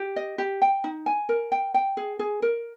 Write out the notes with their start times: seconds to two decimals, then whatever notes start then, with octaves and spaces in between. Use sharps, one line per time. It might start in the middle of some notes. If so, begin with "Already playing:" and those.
Already playing: G4
0.16 D#5
0.38 G4
0.62 G5
0.84 D#4
1.06 G#5
1.29 A#4
1.52 G5
1.74 G5
1.97 G#4
2.19 G#4
2.42 A#4